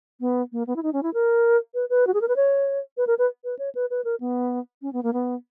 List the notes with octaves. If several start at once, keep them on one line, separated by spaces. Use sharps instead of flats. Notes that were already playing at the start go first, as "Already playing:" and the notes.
B3
A#3
B3
E4
D#4
C#4
E4
A#4
B4
B4
F#4
G#4
A#4
B4
C#5
B4
A#4
B4
B4
C#5
B4
B4
A#4
B3
C#4
B3
A#3
B3